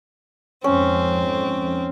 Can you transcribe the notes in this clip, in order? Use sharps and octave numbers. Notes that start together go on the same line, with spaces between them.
F2 G#2 C4 C#4